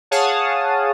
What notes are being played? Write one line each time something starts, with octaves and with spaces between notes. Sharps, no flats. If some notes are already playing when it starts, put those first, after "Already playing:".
G#4 C#5 F5 F#5 A5 D#6